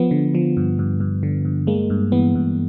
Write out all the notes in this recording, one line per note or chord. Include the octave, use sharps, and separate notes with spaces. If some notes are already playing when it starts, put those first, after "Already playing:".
Already playing: F3 B3
D3
F3
G2
G2
G2
D3
G2
G#3 A#3
G2
E3 B3
G2